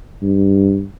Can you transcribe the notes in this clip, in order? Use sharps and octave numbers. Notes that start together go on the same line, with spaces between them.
G2